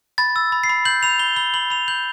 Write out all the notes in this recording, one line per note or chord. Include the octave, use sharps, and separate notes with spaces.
B5 A6
E6
B5
C7
B5
G6 F#7
B5 F7
B5 G7
B5 G7
B5 F#7
B5 F7
G6 F#7